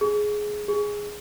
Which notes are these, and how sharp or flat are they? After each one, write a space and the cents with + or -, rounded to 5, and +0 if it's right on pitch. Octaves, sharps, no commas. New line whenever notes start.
G#4 +10
G#4 -5